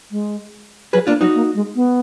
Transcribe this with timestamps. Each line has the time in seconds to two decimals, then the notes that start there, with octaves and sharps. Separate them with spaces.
0.11 G#3
0.93 F#3 G#4 B4
1.07 A#3 D4 F4
1.21 F#3 D#4 F#4
1.35 A#3
1.55 G#3
1.76 B3